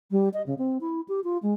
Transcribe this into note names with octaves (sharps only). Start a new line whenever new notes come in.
G3
D#5
C#3
C4
E4
G4
F4
G#3